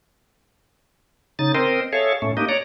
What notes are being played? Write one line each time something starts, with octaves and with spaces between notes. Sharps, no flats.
C#3 D#4 A6
C4 A#4 C5 D#5
G#4 A4 C#5 E5 F5
A2 A3 C#4
A#3 D4 D#4 G4 D#5
C#5 D5 A#5